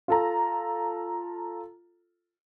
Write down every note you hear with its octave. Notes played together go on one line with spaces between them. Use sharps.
F4 A4 A#5